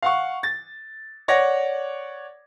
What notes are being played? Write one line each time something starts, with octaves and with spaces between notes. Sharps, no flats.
F5 F#5 C#6
A6
C#5 D5 F#5 A#6